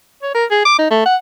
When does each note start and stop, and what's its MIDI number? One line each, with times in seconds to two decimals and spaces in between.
0.23 0.32 73
0.35 0.45 70
0.51 0.61 68
0.65 0.76 86
0.78 0.86 63
0.91 1.06 57
1.06 1.16 78